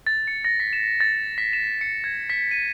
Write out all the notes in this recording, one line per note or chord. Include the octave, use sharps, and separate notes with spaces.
A6
C#7
A#6
B6
E7
A6
B6
E7
C#7
G#6
B6
D#7